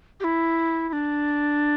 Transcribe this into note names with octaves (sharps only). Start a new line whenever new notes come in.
G4
E4
E4
D4